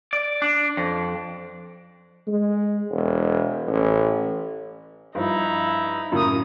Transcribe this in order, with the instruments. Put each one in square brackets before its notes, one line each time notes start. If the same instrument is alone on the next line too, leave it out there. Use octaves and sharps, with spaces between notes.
[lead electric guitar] D5
D4
F2
[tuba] G#3
E1
A1
[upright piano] G2 F3 [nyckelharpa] D#4 E4
[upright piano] F#2 A2 C#3 [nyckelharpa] A#3 D#6